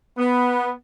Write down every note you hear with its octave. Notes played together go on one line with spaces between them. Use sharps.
B3